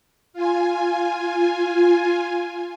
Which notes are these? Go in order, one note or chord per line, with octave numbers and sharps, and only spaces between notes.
F4 G#5